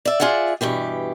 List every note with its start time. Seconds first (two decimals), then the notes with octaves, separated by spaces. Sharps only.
0.05 D5 E5
0.20 F4 G#4 D5 E5 F#5
0.61 G2 B2 E3 G4